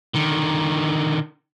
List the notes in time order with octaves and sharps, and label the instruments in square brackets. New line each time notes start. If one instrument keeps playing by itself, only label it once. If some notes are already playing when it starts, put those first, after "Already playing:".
[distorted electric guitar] D3 D#3